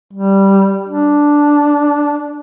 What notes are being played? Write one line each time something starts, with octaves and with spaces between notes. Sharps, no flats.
G3
D4